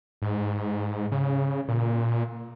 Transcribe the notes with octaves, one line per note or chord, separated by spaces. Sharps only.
G#2
C#3
A#2